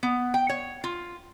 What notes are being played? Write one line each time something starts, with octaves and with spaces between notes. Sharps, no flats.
B3
G5
C#5
F4